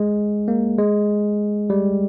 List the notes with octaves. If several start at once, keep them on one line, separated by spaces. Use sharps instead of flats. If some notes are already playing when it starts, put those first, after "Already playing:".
Already playing: G#3
A#3
G#3
G3